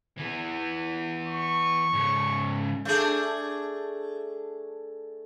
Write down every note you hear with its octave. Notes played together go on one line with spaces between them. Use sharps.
E3 B3
C#6
G#2 C#3
A3 D4 G#4